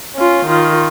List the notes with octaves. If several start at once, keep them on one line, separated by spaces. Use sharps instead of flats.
C#4 F4
D#3 F4